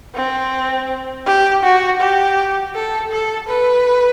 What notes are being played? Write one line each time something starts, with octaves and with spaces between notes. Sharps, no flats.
C4
G4
F#4
G4
A4
A4
B4